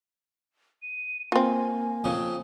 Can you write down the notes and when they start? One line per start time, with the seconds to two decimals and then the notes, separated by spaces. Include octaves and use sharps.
0.82 D#7
1.32 A#3 C4 F4 G#5
2.04 F2 C#3